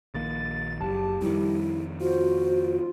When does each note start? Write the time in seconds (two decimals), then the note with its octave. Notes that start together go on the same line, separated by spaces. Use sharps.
0.14 A#1 D#3 A#3 A6
0.81 F#1 F#2 G4 A5
1.22 F2 D#3 G3 E4
2.01 F4 F#4 C5